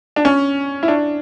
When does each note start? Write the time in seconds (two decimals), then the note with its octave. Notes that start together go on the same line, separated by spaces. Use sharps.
0.16 D4
0.25 C#4
0.83 E4
0.88 D4